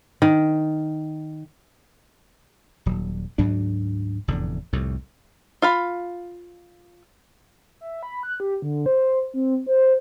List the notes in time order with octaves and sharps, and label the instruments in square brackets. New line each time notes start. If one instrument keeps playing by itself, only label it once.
[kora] D#3
[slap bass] D#1 F#3
D2 G#2 F#3 D4
F1 E2 A2 D3
C2 F2 A2
[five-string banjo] F4 F5 B5
[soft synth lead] E5
B5
F#6
G4
D3
C5
C4
C5